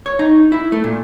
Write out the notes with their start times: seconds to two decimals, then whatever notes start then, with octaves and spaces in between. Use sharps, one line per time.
0.06 C#5
0.19 D#4
0.52 E4
0.72 A3
0.84 A#2